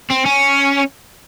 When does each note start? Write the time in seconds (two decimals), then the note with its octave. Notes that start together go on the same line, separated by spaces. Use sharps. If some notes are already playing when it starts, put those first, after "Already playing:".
0.10 C4
0.25 C#4